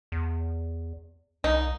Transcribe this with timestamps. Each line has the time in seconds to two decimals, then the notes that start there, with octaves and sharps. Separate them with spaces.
0.12 E2
1.44 C2 D#4